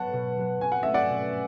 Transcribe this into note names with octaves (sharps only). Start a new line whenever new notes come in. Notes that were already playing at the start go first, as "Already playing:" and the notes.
Already playing: F#3 B3 F#5 A5
B2
F#3 B3
B2 G#5
F#5
A3 C#4 E5
D5 F#5
B2